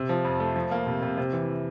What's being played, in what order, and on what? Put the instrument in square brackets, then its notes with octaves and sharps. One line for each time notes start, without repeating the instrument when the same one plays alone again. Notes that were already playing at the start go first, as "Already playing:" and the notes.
Already playing: [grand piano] C3
F3
F2
A3
F3
A#3
C3
C3
C3
E3